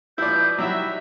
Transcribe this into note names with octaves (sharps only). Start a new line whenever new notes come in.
B2 F3 E4 D5 G6
F#3 G3 D#4 E4 E5